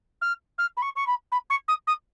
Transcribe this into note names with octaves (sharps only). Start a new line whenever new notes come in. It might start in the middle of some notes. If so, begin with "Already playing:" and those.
F6
F6
B5
C#6
C#6
B5
B5
C#6
D#6
D#6